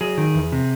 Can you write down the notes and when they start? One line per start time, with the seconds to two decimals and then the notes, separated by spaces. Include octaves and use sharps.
0.01 F#3 G#4
0.18 D#3
0.34 E2
0.52 C3